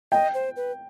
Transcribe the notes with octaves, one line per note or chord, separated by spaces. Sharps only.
D#5 G5
C5
B4